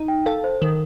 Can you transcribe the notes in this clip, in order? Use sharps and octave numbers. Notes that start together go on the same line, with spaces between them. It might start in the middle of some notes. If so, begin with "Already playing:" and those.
Already playing: D#4
G5
A4 F5
C5
D#3 A#4